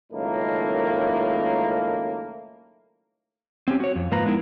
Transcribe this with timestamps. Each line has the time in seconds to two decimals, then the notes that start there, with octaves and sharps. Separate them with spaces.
0.13 C#2 F#2 A2 D#3 A3 A#3
3.68 C4 C#4 G4
3.80 F#4 C#5
3.96 F2
4.11 G#2 F3 A#3 F4 B4 A#5
4.25 G#3 B3 D#4 E4 A#4